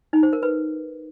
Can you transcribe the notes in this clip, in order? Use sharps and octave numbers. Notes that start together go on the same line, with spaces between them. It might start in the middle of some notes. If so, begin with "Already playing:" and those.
D#4
C5
A#4
B4